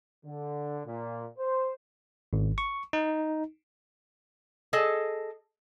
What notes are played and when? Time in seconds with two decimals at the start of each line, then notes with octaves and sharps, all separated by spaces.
0.25 D3
0.86 A#2
1.38 C5
2.33 G#1
2.58 C#6
2.93 D#4
4.73 G#4 A4 D#5